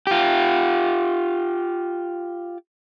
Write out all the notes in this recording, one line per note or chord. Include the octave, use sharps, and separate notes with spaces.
F4 G4